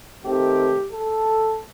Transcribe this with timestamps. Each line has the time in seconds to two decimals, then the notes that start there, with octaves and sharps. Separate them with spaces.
0.23 D#3 A3 C4 G4
0.92 A4